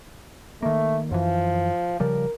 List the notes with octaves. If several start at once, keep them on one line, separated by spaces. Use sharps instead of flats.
D#3 A3 A#3
F#2 E3 F3
C#3 F3 G3 A#4